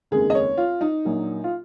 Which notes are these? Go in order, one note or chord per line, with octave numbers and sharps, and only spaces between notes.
F1 D#2 C#3 G#3 G#4
D#5
C#5
F4
D#4
A#1 A#2 F#3 A#3
F4